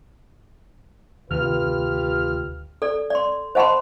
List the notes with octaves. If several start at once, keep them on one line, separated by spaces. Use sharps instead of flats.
D2 C3 D#3 F4 G4 B4 F6
A4 D5
D5 C6
C5 D#5 F#5 A5 B5 C6